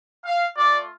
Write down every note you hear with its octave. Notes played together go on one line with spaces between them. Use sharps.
F5
A3 F4 D5